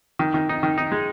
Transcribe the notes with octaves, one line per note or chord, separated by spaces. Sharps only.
D#3
D#3
D#4
D#3
D#4
G#3